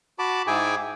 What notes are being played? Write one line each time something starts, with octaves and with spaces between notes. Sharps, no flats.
F#4 A5 B5 D6
G#2 E4 G#4 G5 G#5 D6